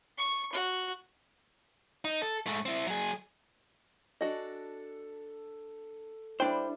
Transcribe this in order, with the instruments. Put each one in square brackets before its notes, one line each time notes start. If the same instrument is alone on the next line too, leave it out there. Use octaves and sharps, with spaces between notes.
[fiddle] C#6
F#4
[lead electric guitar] D#4
A4
G#2 A3
C4 E4
F#3 G#4
[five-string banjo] D4 F#4 D#5 [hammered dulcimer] A4
[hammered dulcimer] G3 E4 [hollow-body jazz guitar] D4 C5 [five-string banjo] G5